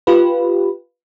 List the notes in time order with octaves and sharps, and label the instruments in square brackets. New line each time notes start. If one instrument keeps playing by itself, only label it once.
[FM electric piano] F4 G4 B4